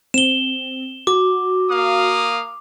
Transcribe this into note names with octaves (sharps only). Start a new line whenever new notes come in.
C4 E7 G7
F#4 D6
A#3 F5 D#6